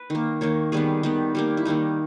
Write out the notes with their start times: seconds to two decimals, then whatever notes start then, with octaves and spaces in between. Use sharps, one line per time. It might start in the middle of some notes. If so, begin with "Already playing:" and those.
Already playing: B4
0.10 D#3 A#3
0.41 D#3 A#3 C#5
0.72 D#3 G3 B3 G#4
1.03 D#3 G3 B3
1.35 D#3 G3 A#3 G4
1.57 E4
1.65 D#3 G3 A#3 D#4